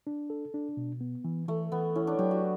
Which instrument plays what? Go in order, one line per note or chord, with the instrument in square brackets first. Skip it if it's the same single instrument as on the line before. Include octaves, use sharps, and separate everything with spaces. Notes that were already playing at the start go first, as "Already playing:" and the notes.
[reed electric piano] D4
A4
D4
B2
B3
E3
[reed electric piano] E3 [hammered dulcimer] A3
[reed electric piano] E3 [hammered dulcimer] B3
[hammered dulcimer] C#4 [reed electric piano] E4
[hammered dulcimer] D4
[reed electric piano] F#3 [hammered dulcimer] G4
[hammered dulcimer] F#4